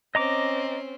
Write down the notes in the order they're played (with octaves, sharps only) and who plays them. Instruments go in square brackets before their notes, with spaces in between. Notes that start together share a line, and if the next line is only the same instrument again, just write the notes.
[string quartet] C4 C#4 [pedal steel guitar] D#5 A#5 D6